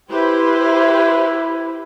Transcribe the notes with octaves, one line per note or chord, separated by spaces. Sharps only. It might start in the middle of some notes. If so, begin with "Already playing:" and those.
E4 G4 B4 C5